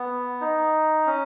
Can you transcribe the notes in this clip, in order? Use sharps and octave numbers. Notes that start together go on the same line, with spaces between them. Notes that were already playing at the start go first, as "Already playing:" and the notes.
Already playing: B3
D#4
C#4